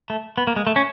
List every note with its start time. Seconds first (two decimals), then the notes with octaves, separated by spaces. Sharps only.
0.10 A3
0.38 B3
0.47 A#3
0.56 G#3
0.67 A3
0.76 C#4